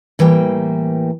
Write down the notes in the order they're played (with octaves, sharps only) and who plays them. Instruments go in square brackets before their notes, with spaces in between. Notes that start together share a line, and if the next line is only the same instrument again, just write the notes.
[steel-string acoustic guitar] A2 E3 G3 A#3 G5